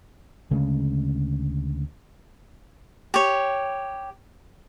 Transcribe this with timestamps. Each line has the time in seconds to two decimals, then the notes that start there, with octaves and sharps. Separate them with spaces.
0.51 D2 C#3 G#3 C#4
3.14 G4 C#5